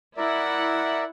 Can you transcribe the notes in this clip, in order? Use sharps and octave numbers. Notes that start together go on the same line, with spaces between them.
E4 A#4 D5 E5 F#5